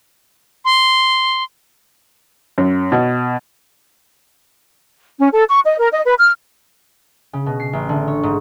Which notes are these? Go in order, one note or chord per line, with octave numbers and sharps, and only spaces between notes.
C6
F#2
B2
C#4
A4
C#6
D#5
A#4
D#5
B4
F6
C#3
B2
C7
A1
D3
C#5
G#2